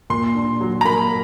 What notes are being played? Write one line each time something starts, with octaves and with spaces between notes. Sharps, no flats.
A#2 C6
D4
F#3
A#5
A#3 B5